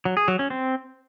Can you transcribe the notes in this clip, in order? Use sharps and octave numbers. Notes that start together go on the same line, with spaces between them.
F#3
G#4
F#3
C#4
C4